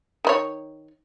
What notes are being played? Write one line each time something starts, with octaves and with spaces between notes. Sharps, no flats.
D#3 E4 C#5